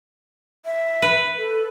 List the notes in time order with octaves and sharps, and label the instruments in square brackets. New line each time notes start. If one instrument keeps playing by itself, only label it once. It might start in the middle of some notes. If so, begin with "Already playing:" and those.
[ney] E5
[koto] B4
[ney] A4